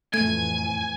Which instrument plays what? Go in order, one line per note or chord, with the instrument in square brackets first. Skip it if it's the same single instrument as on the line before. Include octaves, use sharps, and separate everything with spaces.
[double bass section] F2 A2 E3 [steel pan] A3 [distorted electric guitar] G#5 [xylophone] G#6